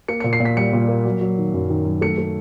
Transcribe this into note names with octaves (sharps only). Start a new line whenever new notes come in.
A#3 C#7
A#2 C#7
C7
A#2
B6
G3 C#7
A#2
A#3
F#3
F#3
D#3
F#2
D#3
F#3
A3 C#7
A3